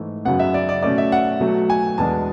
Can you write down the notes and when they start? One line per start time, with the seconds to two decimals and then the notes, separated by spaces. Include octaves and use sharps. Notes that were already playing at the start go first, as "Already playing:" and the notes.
Already playing: G#2 E3 A3
0.25 F#2 C#3 F#3 B3 F#5
0.39 E5
0.54 D5
0.69 D5
0.83 B2 A3 C#4 D5
0.98 E5
1.12 F#5
1.40 B2 F#3 A3
1.70 G#5
1.98 E2 B2 G#3 B3 D4 A5